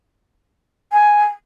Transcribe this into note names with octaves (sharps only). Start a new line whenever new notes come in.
G#5